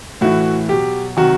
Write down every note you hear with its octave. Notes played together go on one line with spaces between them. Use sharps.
A2 E3 F#4
B2 F#3 G4
C3 D#3 F#3 F#4